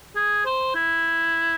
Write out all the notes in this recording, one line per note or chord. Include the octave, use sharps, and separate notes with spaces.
G#4
C5
E4